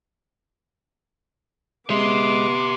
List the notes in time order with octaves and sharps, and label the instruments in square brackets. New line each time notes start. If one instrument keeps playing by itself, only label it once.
[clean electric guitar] G#3 [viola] B3 D6 [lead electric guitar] G4 E5 [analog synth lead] C6